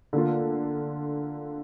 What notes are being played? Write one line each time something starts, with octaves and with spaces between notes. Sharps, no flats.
D3 A#3 F4